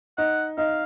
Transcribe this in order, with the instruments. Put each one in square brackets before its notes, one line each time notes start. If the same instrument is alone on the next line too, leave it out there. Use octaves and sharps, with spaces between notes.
[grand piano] D#4 [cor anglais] F#5
[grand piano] D#4 [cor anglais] F5